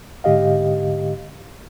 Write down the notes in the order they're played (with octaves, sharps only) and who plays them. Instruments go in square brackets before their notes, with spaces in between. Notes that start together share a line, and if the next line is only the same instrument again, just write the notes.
[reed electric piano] G#2 D3 G4 D#5 F5